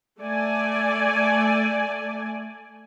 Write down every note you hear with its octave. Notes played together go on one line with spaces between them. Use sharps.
A3 D5 G#5